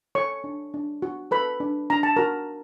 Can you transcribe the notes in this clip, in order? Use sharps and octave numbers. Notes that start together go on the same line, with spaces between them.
A4 C#5 C#6
D4
D4
F#4
A4 B4 B5
D4
D4 A#5
A5
F#4 A#4 A#5